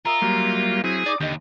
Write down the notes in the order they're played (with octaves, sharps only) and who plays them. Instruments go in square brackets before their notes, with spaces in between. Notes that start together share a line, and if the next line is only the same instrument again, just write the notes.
[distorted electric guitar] F4 [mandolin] A#4 E5 D#6
[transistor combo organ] F#3 G3 A#3
[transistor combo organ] F#3 C4 E4 [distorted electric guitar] G#4
[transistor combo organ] D#4 [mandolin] D5 D6 D#6
[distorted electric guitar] D#2 [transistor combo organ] D3 [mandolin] G4 D#5